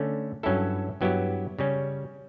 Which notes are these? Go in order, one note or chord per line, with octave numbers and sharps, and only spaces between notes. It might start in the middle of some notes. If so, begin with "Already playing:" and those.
Already playing: D3 A3 C#4
G2 F#3 C#4 E4 A4
G2 F#3 B3 E4 G4
C#3 G3 C#4